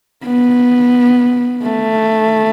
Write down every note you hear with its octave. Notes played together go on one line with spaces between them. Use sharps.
B3
A3